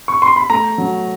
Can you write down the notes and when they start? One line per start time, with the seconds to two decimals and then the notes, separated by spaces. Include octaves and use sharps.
0.08 C#6
0.22 C6
0.36 B5
0.50 A3 A#5
0.78 F#3